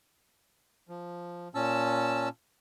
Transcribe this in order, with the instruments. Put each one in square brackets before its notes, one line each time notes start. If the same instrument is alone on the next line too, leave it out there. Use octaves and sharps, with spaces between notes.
[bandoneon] F3
A#2 C#4 A5 E6